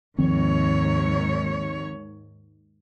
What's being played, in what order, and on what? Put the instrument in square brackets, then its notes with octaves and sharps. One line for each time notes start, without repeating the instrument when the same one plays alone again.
[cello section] D#2 G#2 C#5 [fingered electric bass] D#3 F3 C4